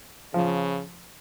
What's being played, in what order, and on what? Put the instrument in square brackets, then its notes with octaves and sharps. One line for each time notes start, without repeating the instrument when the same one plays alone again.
[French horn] C#3 [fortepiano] F3